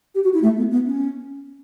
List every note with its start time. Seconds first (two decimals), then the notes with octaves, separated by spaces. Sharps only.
0.15 G4
0.24 F#4
0.34 E4
0.42 A3
0.57 B3
0.71 B3
0.86 C#4